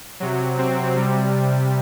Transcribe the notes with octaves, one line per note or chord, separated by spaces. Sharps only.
C3 F#3
C4
C3 G3